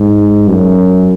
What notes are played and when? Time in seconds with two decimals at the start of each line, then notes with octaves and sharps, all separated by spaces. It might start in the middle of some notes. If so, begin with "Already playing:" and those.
Already playing: G#2
0.48 F#2